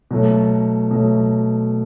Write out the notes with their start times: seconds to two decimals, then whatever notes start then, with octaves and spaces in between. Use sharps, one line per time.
0.11 B2 F#3 A3
0.91 B2 F#3 A3